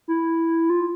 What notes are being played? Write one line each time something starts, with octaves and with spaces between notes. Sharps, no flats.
E4
F4